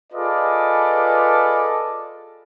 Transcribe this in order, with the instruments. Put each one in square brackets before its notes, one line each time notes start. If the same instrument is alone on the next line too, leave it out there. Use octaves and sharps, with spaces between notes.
[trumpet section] F4 G#4 A4 B4 D5 D#5